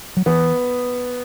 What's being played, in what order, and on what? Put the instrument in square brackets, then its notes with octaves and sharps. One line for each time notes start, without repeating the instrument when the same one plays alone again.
[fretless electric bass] F#3
[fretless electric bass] E3 [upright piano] B3